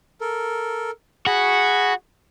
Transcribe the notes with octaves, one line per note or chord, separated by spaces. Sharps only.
A4 A#4
F#4 G#4 B5